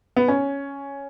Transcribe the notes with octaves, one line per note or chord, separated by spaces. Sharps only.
B3
C#4